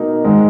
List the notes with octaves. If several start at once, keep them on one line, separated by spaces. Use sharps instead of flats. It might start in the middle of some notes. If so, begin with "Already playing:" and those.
Already playing: B2 A#3 D#4
G#2 D#3 G#3